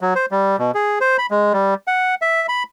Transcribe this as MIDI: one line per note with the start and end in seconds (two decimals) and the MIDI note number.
0.01 0.14 54
0.15 0.26 72
0.31 0.56 55
0.59 0.71 47
0.74 0.99 68
1.01 1.17 72
1.18 1.26 83
1.31 1.53 56
1.53 1.74 55
1.87 2.15 78
2.22 2.46 76
2.49 2.63 83